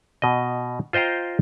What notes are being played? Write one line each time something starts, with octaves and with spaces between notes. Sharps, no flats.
B2 D#5
F4 C5 D#5 G5 A#5